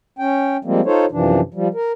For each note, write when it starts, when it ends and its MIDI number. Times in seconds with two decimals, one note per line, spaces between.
0.19 0.57 61
0.19 0.57 79
0.65 0.81 53
0.65 0.81 55
0.65 0.81 56
0.65 0.81 58
0.65 0.81 60
0.85 1.05 63
0.85 1.05 65
0.85 1.05 69
0.85 1.05 72
0.85 1.05 73
1.12 1.40 42
1.12 1.40 48
1.12 1.40 52
1.12 1.40 53
1.12 1.40 62
1.54 1.68 53
1.54 1.68 55
1.74 1.92 70